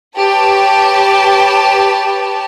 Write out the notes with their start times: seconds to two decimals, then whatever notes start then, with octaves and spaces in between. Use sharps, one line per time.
0.17 G4 B4 C#5 A5